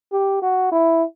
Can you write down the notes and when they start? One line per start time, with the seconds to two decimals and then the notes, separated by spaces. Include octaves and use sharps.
0.12 G4
0.42 F#4
0.72 E4